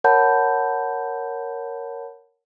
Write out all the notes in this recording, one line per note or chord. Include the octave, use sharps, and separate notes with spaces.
A#4 C#5 F#5 A5 B5 G6